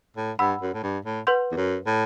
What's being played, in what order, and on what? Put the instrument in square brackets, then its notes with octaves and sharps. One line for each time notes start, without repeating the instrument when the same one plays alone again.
[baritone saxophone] A2
[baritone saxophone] G2 [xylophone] F#5 B5 E6
[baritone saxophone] F#2
A2
G2
A2
[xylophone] B4 F#5 C6 G6
[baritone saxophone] E2
F#2
A2